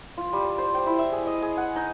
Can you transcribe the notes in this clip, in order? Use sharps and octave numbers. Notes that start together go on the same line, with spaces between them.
F4
G3
D5
C5
G5
E4
E5
G#4
D#5
G#4
F#5
D#4